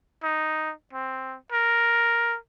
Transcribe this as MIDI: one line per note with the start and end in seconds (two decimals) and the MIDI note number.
0.23 0.73 63
0.94 1.37 60
1.52 2.37 70